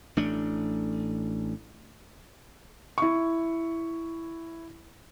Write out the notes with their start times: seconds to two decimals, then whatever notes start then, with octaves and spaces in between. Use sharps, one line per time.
0.17 A1 A3 D4
2.98 E4 C#6